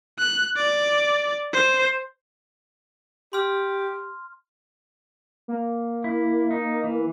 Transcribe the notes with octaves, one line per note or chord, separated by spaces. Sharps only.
F#6
D5
C5
G4 C6 F6
A#3
E4
D#4
E3